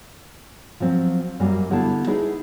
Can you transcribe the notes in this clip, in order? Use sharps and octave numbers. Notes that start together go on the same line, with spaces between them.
F3 F#3 C4
F#2 F#3 G3 A#3 F#4 G#5
D3 B3 E4 G4 F5 A5
D#4 E4 G#4 B4